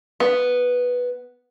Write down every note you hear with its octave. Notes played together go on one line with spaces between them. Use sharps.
B3